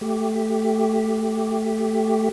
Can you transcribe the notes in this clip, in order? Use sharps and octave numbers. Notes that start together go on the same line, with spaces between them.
A3 G4